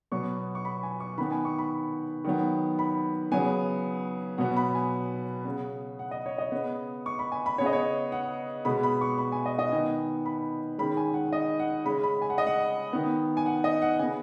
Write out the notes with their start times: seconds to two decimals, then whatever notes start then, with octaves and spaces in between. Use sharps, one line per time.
0.12 B2 F#3 B3 C#6
0.55 C#6
0.65 B5
0.83 G#5
1.00 C#6
1.18 D#3 B5
1.21 B3
1.31 G#5
1.45 C#6
1.58 B5
2.24 D#3 F#3 B3
2.79 B5
3.32 C#3 F#3 B3 G#5
4.38 B2 F#3 B3 F#5
4.57 B5
4.75 G#5
5.45 C#3 B3
5.99 F#5
6.11 D#5
6.26 C#5
6.38 D#5
6.52 C#3 B3
7.06 C#6
7.19 B5
7.32 G#5
7.46 B5
7.58 C#3 B3 C#5
7.66 D#5
7.73 C#5
8.12 F#5
8.65 B2 G#3 B3 B5
8.83 B5
9.01 C#6
9.18 B5
9.32 G#5
9.46 D#5
9.59 D#5
9.72 D#3 B3 G#5
10.26 B5
10.78 D#3 G#3 C#4 B5
10.97 G#5
11.14 F#5
11.33 D#5
11.60 F#5
11.85 C#3 G#3 C#4 B5
12.03 B5
12.22 G#5
12.30 F#5
12.38 D#5
12.47 F#5
12.93 D#3 B3
13.37 G#5
13.46 F#5
13.64 D#5
13.82 F#5
13.99 C#3 B3 G#5